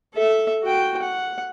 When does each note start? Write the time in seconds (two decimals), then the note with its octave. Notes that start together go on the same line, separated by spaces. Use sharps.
0.14 A4 E5
0.63 F#4 G5
1.02 F#5